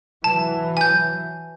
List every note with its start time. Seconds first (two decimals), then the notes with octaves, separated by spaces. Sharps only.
0.24 E3 F#3 A5
0.77 G#5 G6